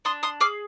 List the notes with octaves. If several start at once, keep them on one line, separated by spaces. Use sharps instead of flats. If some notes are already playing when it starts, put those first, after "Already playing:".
D4 C6 D#6
C6 D#6
G#4 D6 F6